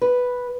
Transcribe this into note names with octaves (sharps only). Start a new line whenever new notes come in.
B4